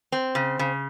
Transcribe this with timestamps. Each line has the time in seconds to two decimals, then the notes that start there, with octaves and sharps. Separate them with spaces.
0.12 C4
0.35 C#3
0.59 C#3